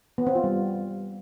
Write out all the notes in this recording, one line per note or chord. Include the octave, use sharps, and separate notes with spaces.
B3
C4
F4
G3